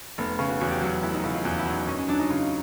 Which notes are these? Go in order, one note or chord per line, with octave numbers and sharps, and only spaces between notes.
F1 B3
C#3 C#4
F#4
E2 F#4
G4
F#3 F#4
F1 E4
D#4
C#3 E4
F4
E2 F#4
E4
F#3
D#4
F#2 C#4
C#4
F#3 D4
D#4
C#3 F4